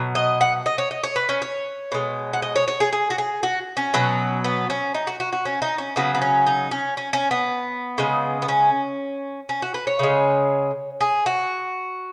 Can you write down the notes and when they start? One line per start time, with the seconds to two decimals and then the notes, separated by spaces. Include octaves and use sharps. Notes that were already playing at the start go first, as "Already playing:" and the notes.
Already playing: B2 F#3
0.15 D#5
0.41 F#5
0.66 D#5
0.78 C#5
0.91 D#5
1.03 C#5
1.16 B4
1.29 C#4
1.42 C#5
1.92 B2 G#3
2.33 F#5
2.42 D#5
2.56 C#5
2.68 C#5
2.80 G#4
2.92 G#4
3.10 F#4
3.18 G#4
3.43 F#4
3.77 C#4
3.94 B2 F#3
4.44 B3
4.70 C#4
4.94 D#4
5.07 F#4
5.20 F#4
5.33 F#4
5.45 C#4
5.62 D#4
5.78 C#4
5.96 C#3 F#3 B3
6.15 B3
6.22 C#4
6.46 D#4
6.71 C#4
6.97 C#4
7.13 C#4
7.31 B3
7.98 C#3 G#3
8.42 B3
8.48 C#4
9.49 C#4
9.62 F#4
9.74 B4
9.87 C#5
9.99 C#3 G#3
11.01 G#4
11.26 F#4